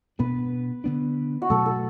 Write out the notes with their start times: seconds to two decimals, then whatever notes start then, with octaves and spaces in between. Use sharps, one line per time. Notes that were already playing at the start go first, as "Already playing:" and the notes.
0.19 B2 B3 D4 B4
0.84 D3 B3 D4
1.42 F#4
1.50 B2 F#3 A3 A4
1.66 A4